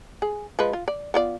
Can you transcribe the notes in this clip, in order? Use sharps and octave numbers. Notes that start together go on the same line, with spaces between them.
G#4
F3 G#3 B4
F4
D5
B3 F4 D5